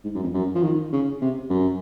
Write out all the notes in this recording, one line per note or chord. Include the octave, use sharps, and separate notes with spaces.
G#2
F#2
F2
F#2
F3
D#3
C#3
C3
F#2